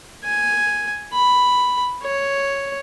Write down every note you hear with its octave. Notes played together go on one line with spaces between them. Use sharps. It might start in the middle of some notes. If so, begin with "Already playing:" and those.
G#5
B5
C#5